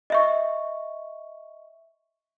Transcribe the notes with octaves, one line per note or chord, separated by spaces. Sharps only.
D#5 E5 C#6